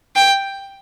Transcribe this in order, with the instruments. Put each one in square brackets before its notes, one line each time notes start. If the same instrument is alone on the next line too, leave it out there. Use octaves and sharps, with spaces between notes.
[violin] G5